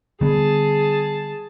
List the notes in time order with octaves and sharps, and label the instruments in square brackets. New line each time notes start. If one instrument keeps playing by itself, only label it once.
[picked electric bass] D3 G3 B3 [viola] G#4 A5